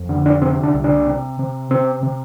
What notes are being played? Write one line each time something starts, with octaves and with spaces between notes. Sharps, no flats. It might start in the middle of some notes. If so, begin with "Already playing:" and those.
Already playing: F2
D3
D4
C3 C4
D4
C2
D4
C3
C3
C3 C4
C3